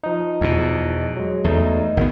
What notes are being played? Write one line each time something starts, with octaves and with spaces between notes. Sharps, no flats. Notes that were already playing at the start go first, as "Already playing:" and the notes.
F3 D#4
E2 B2
F#3 G#3
E2 A3 D#4
G#1 D#3 B3